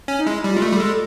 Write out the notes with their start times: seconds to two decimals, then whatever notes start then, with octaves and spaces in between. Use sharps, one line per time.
0.08 C#4
0.18 D#4
0.26 G#3 E4
0.44 G3
0.50 F4
0.57 G#3
0.62 A3
0.72 G3 A4
0.80 G#3